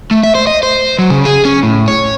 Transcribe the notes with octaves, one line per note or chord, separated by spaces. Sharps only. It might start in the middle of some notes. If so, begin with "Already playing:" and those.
A3
E5
C5
D#5
C5
F#3
C#3
G#4
C#4
A2
C#5